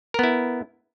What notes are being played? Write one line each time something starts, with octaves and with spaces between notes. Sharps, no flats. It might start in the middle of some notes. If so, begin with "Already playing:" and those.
B3 E4 A#4